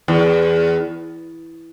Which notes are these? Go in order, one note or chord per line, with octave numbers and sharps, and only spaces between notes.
E2